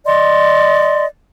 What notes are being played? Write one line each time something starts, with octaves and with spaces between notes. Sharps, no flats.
D5 D#5 C6